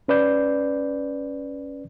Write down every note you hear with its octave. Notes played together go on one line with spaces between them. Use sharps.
C#4 B4 D5 G6